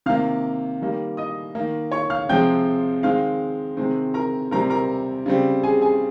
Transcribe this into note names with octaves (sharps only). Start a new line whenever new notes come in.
C3 D#3 A#3 F5 F6
D#3 G3 A#3
D#5 D#6
D#3 A#3
C#5 C#6
F5 F6
C3 F3 G#3 C4 G5 G6
D#3 G#3 C4 F5 F6
C3 D#3 G#3 C4
A#4 A#5
C3 G3 C4 A#4 A#5
A#4 A#5
C#3 G3 C4
G#4 G#5
G#4 G#5